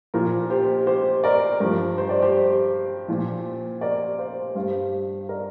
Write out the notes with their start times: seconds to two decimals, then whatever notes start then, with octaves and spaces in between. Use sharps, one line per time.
0.14 A#2 F3 A#4
0.50 G4 C5
0.86 G4 C5
1.24 A#4 D5
1.60 G2 F3 A#4
1.98 C5
2.09 D5
2.22 G4 C5
3.08 A#2 F3
3.81 A#4 D5
4.18 C5 F5
4.55 G2 G3 C5 F5
5.29 A#4 D5